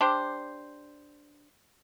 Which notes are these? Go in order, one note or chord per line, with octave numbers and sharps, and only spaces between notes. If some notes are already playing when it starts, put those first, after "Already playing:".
D4 G4 C5